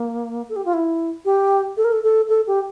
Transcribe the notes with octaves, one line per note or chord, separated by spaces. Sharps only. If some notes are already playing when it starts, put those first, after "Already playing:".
Already playing: A#3
A4
G4
F4
E4
G4
A4
A#4
A4
A4
A4
G4